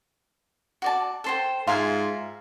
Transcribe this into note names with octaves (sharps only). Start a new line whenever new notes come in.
F#4 D5 A5
A4 C5 G5
G#2 F4 E5 F5 G#5 C6